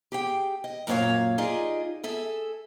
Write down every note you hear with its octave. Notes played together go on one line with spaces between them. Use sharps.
G4 G#4 G5
D#5
F#2 A#2 A#3 D4 C#5 F5
D#4 F4 G4 G#4 D5 D#5
G#4 A4 E5